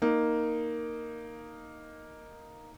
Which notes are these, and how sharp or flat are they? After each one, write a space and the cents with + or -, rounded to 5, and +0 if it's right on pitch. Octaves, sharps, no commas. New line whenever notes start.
A#3 +0 D#4 +0